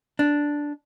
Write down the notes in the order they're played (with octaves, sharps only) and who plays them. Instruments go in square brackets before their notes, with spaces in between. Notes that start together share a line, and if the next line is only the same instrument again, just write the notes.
[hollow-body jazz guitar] D4